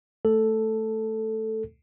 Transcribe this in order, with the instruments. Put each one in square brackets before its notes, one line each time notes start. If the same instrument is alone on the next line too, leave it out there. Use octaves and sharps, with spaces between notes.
[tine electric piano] A3 A4